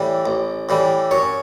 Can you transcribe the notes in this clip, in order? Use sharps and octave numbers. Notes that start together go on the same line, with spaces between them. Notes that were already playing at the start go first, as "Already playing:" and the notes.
Already playing: A2 E3 G3
A1
A2 E3 G3
F#2 C#5